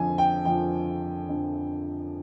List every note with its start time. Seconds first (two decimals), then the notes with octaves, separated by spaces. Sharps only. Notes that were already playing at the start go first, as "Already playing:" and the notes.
Already playing: F2 D3 F3 G#5
0.18 G5
0.45 F2 D3 F3 G5
1.29 F2 D3 F3